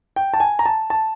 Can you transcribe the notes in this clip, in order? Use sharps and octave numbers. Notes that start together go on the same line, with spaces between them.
G5
A5
G#5
A#5
A5
A5